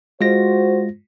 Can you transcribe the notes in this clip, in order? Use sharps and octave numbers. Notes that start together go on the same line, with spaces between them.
G#3 F4 F#4 C5 A#6